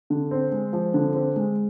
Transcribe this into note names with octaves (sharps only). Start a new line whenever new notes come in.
D3
C4
G#3
F3
D3
C4
G#3